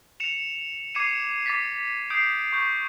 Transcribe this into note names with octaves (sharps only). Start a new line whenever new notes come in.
C#7 E7 F7
D6 G#6 C7 C#7 D#7 E7
D6 A6 B6
D#6 G6 C7 D7
C#6 G6